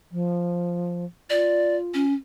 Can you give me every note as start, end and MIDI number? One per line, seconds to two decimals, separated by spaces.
0.11 1.05 53
1.30 2.04 65
1.30 1.77 74
1.94 2.13 61